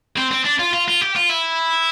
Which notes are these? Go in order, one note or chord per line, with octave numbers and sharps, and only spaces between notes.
C4
C4
D4
F4
F4
F4
G4
F4
E4